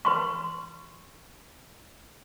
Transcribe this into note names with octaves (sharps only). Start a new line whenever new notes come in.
B4 C6 C#6